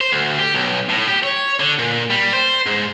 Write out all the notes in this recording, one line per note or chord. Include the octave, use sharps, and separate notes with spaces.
C5
D2
G4
B1
A2
G4
C#5
D3
A#2
G3
C5
G#2